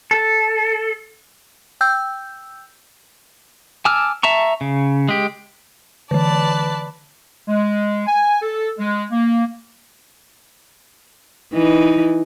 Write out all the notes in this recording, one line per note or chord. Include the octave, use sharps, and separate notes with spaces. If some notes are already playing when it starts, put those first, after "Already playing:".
A4
G5 E6 G6
G#5 A5 D6 E6 F6
E5 A5 A#5 C#6
C#3
G#3 G4
D3 E3 B4 D5 A5
G#3
G#5
A4
G#3
A#3
E3 D#4